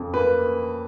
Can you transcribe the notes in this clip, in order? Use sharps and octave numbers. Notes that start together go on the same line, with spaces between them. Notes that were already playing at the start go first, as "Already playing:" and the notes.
Already playing: F2 C#3 F3
A#3 B4